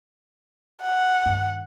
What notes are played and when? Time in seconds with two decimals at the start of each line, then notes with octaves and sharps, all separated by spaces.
0.82 F#5
1.26 G2 D#3